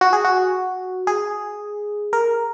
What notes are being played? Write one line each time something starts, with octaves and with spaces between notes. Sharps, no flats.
F#4
G#4
F#4
G#4
A#4